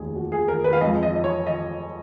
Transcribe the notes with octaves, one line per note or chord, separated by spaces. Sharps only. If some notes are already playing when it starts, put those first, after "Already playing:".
Already playing: F1 D#2 D#3 G#4
F#4
G#4
A#4
B4
F5
F2 F3 G#3 D#5
D#5
D#5
C#5
D#5